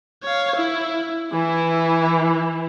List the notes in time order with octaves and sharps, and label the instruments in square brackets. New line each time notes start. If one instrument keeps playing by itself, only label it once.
[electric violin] C#5 F5
E4
[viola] E3 [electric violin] E4